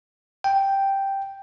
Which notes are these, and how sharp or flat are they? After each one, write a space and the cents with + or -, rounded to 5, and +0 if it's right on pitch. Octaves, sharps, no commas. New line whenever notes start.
G5 +0